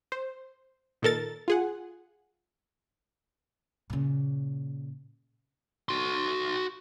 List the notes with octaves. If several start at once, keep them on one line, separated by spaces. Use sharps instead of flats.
C5
A#2 D#3 A4 A#4 A6
F4 G#4 F#5
A#2 C#3
F#4 C6